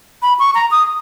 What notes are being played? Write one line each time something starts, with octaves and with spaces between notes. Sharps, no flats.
B5
C#6
A#5
D#6